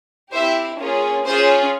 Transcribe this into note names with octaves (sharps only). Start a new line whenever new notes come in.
C4 E4 G4 C5 E5
A#3 C#4 F4 G#4
C#4 F4 G#4 C5